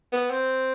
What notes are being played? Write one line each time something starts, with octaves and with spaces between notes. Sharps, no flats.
B3
C4